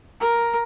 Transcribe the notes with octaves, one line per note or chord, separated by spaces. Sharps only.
A#4